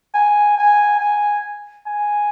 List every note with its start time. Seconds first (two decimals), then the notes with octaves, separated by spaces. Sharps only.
0.14 G#5
0.58 G#5
1.00 G#5
1.87 G#5